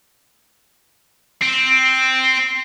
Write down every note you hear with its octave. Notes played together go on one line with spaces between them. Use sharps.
C4